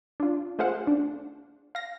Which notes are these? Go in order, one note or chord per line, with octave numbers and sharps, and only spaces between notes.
D4 F4
A3 F4 G#4 C5 F5 F#5
D4
F5 A#6